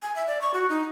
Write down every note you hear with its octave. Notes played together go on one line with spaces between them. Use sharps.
G#5
E5
D5
C#6
F#4
D#4